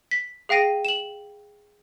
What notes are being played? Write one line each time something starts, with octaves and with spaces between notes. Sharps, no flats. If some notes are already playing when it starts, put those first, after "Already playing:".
B6
G#4 F5 G5 A#6 D#7
E7 F#7